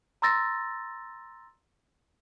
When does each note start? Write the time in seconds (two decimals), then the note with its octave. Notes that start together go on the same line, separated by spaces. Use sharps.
0.22 A#5 C6 E6 A6 A#6